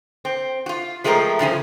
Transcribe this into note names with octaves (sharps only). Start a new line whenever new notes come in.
C4
F4 F#4
F3 G#3 A3 C4 A#4
G2 C#3 F3 G#5